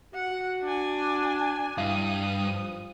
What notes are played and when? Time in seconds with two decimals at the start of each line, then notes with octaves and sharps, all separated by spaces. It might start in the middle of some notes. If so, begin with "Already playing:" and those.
0.14 F#4 F#5
0.62 D4 G#5
1.78 G2 E4 F5 D#6
2.43 F3